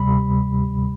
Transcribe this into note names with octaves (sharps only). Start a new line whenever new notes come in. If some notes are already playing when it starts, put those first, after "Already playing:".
Already playing: D2 C3 G3 B5